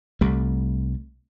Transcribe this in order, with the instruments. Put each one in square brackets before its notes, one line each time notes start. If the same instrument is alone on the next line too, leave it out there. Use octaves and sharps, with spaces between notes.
[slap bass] C2 G3 A3